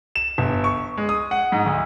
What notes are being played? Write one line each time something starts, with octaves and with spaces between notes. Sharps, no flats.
E7
G1
C#6
G#3
D#6
F#5
G#2
D2